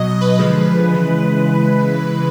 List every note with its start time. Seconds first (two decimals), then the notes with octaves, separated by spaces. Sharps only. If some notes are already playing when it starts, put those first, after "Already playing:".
Already playing: B2 F#3 D#5
0.21 B4
0.39 D3 F3 G#3 B4
0.94 C#3 E3 G#3